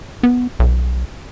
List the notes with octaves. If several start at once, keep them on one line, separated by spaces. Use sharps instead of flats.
B3
B1